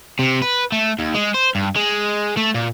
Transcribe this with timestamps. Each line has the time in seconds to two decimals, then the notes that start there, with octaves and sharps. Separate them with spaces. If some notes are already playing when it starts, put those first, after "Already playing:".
0.19 C3
0.42 B4
0.72 A3
0.99 D#2
1.14 G#3
1.34 C5
1.55 G2
1.76 G#3
2.37 A3
2.55 A#2